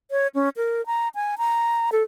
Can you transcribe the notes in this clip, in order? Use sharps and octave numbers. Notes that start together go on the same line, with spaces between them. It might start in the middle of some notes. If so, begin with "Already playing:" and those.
C#5
C#4
A#4
A#5
G#5
A#5
A4